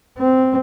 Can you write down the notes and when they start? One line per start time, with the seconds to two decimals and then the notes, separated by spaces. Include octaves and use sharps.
0.18 C4